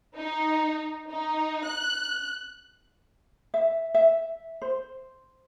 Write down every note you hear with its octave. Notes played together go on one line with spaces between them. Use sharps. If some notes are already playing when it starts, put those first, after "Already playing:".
D#4
D#4
F#6
E5
E5
C5